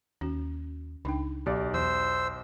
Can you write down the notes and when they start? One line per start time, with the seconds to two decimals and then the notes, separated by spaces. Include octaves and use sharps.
0.21 D#2 C#4 F#4
1.05 C#2 D4 D#4 G5
1.46 B1 G4 D5 F5
1.74 E2 C5 E6